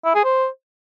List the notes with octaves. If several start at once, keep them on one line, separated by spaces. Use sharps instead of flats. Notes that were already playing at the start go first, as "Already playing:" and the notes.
E4
G#4
C5